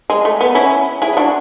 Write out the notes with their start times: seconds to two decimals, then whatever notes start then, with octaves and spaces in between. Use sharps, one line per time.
0.10 G#3
0.25 A3
0.41 B3
0.55 C#4 E4
1.02 E4 G#4
1.17 D4 F#4